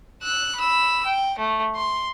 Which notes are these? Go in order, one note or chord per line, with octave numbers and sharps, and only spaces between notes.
E6 F#6
B5 E6
G5
A3
C6